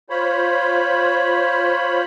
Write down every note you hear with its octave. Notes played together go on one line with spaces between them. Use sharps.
F4 C5 C#5 B5